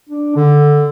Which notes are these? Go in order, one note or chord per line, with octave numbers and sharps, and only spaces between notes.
D4
D3